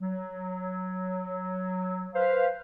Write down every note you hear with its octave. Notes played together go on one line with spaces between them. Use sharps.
F#3
B4 C5 F5